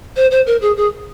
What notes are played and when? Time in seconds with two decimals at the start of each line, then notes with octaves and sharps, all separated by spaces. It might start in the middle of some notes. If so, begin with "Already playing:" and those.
0.16 C5
0.31 C5
0.46 A#4
0.61 G#4
0.77 G#4